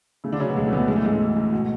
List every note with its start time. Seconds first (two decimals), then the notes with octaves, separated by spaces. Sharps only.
0.24 C#3 A3
0.32 D3 D4
0.40 C#3 F#3 C#4
0.48 B2 B3
0.56 D2 G#3
0.67 A3
0.73 D2 B3
0.78 A3
0.88 E3 G#3
0.96 A3
1.04 G#2 G#3
1.13 A3
1.20 E3
1.37 G#2
1.53 B2